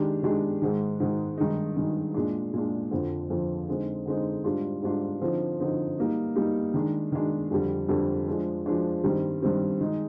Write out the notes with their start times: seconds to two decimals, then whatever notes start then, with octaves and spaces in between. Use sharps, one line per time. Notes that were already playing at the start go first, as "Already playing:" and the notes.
Already playing: D#3 G#3 D4 G4
0.23 D#3 G#3 D4 G4
0.62 G#2 D#3 G#3
1.00 G#2 D#3 G#3
1.38 G2 D#3 G#3 D#4
1.77 G2 D#3 G#3 D#4
2.14 A#2 G#3 D4
2.54 A#2 G#3 D4
2.91 F2 D3 F3
3.30 F2 D3 F3
3.68 D3 G#3 C4 D#4
4.06 D3 G#3 C4 D#4
4.44 G#2 G3 D4 F4
4.82 G#2 G3 D4 F4
5.21 D3 F3 C4 D#4
5.60 D3 F3 C4 D#4
5.98 G3 A#3 D#4
6.36 G3 A#3 D#4
6.74 D#3 G#3 D4
7.12 D#3 G#3 D4
7.51 F2 D3 G3
7.89 F2 D3 G3
8.28 F3 G#3 D4
8.66 F3 G#3 D4
9.04 G2 D#3 G3 C4
9.42 G2 D#3 G3 C4
9.80 D#3 G#3 D#4 G#4